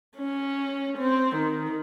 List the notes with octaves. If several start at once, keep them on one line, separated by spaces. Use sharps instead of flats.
C#4
C4
D#3